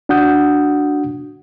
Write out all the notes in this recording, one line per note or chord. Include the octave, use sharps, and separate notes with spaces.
D4 F#4 F#5 D#6 G6